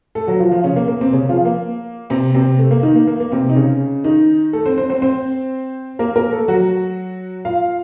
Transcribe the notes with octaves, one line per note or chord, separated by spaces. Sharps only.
A3 A4
F#3 F#4
F3 F4
F3 F4
C#3 C#4
A#3
A#3
C3 C4
C#3 C#4
F3 F4
A#3
C3 C4
C3 C4
A3
A#3
D#3 D#4
A#3
A#3
A#3
C3 C4
D#4
C#3 C#4
D#3 D#4
A3 A4
C4 C5
C4 C5
C4 C5
C4 C5
A#3 A#4
A#3 A#4
A3 A4
F#3 F#4
F4 F5